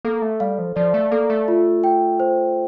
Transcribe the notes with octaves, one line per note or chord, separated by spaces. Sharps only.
A#3 A4
A3
G3 F5
F3
F3 D5
A3
A#3 A4
A3
F4
G5
C5